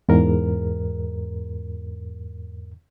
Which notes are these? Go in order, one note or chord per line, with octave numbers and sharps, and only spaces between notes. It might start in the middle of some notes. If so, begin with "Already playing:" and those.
E2 G#2 A#4